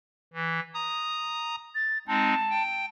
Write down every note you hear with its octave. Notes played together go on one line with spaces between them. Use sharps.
E3
A#5 D#6
A6
G#3 C4 D#4 A5
G5